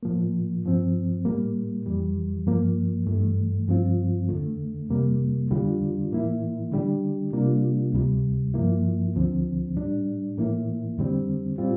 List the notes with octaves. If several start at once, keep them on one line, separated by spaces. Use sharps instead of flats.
A2 F3 A#3
G2 F3 C4
A2 G3 A#3
F2 E3 G3
G2 F3 A#3
G2 E3 A3
G2 F3 C4 F4
E2 D3 A3
E2 C3 G3 A#3
E2 D3 G3 D4 F4
A2 E3 A#3 E4
D3 G3 D4 G4
C3 G3 A#3 D4 F4
D2 C3 G3
G2 F3 A#3 E4
D2 D3 F3 C4
A2 G3 D4
A2 E3 A#3 E4
E2 D3 G3 C4
A2 G3 C4 F4